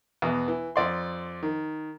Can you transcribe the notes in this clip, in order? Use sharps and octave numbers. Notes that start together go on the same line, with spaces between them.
E2 B2
E3
F2 D5 C6
D#3